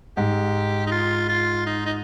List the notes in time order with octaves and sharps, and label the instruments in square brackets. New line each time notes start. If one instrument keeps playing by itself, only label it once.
[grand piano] G#2 [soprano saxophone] G4
[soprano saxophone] D#4
F4
F4
D#4
D#4